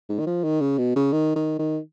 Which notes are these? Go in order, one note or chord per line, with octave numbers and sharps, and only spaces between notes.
G#2
D#3
F3
D#3
C#3
B2
C#3
D#3
D#3
D#3